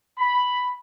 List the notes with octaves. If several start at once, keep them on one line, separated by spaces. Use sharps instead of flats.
B5